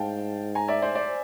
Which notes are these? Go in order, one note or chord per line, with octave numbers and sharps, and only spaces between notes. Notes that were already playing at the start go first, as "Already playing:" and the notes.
Already playing: G#2 F5 G5 A5
G#5 A#5
D5 E5
C5 D5
C5 D5